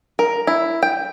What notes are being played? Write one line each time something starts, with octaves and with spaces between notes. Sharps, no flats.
A#4
E4
G5